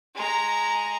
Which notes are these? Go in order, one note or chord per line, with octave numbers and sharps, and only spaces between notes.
G#3 A#5